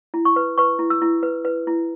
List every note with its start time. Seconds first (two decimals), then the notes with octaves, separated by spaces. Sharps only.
0.14 E4
0.25 C#6
0.36 B4
0.58 B4 C#6
0.79 E4
0.90 E6
1.02 E4
1.23 B4
1.45 B4
1.67 E4